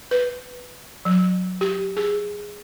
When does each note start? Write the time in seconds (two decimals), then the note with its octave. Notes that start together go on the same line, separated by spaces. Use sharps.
0.11 B4
1.05 F#3
1.61 G4
1.97 G#4